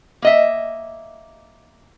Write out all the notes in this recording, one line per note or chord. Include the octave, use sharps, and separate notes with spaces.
A#3 D#5 E5